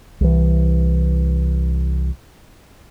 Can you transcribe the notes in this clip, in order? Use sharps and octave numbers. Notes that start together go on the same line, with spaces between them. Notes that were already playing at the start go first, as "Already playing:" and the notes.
C2 E3